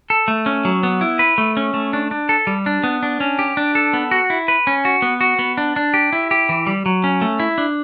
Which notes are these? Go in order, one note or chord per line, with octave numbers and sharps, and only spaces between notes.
A4
A3
C#4
F#3
B3
E4
B4
A3
C#4
A3
D4
D4
A4
G3
D4
B3
D4
C#4
G4
D4
A4
B3
F#4
E4
B4
C#4
F#4
B3
F#4
B3
D4
D4
G4
E4
G4
E3
G3
F#3
C#4
A3
E4
D4